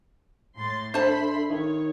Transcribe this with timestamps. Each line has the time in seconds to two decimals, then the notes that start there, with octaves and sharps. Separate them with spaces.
0.57 A2 C6 A6
0.94 D4 A4 C5 E5 A5 B5 C6
1.50 D#3 C#5